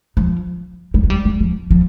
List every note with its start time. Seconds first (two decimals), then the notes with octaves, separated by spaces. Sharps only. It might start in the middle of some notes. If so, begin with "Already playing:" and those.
0.17 F3
0.94 G3
1.03 G#3
1.10 G3
1.25 F#3
1.41 F3
1.71 F3